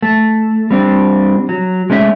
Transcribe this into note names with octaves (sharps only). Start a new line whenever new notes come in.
A3
G3 C4 D4
F#3
G#3 A3 C#4 D4 E5